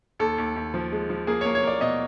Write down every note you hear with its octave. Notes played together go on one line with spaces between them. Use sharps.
D#2 A4
D#2
D#2
F3
G#3
F3
A#3 G#4
A#3 C#5
C#5
A#3 D5
B2 D#5